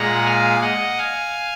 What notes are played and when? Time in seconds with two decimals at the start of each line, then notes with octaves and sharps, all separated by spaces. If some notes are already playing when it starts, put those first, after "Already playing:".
Already playing: A#2 G#3 F#5 A#5
0.26 F5 G#5
0.61 D#5 F#5
0.98 F5 G#5